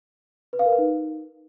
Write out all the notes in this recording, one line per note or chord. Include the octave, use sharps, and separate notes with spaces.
B4
F5
A#4
B4
D#4